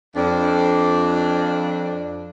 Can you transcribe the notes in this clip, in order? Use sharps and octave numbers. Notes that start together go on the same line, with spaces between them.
F2 D4